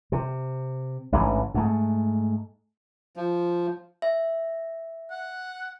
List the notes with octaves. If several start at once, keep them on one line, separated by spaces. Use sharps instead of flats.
C3
A1 G#2 D3 E3
G#2 A3
F3
E5
F#5